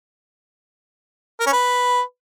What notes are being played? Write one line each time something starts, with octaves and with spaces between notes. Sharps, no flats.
A#4
C#4
B4